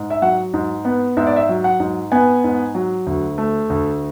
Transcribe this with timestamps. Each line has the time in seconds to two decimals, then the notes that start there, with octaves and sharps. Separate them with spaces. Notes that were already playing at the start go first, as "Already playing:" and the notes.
Already playing: G#2
0.10 E5
0.22 F#3 F#5
0.54 G#2
0.85 B3
1.17 G#2 E5
1.27 D5
1.36 E5
1.49 F#3
1.64 F#5
1.80 G#2
2.12 B3 G#5
2.44 G#2
2.75 F#3
3.06 D2
3.38 A3
3.70 D2